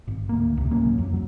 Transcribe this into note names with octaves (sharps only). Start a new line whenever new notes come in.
G#1
D2 A#3
C#2 C3
A1 F#3 A#3 C#4
F2
F#3